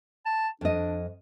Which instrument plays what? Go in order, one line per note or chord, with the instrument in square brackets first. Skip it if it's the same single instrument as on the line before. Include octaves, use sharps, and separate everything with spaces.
[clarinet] A5
[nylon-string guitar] F2 D#5 [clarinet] D4